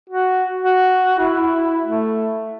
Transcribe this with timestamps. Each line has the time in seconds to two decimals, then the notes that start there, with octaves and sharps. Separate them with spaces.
0.10 F#4
0.63 F#4
1.19 E4
1.85 A3